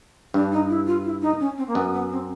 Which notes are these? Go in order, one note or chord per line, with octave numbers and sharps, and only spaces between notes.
G2 D4
D#4
E4
F4
E4
D#4
C#4
C4
A#3
F#2 B3
B3
C4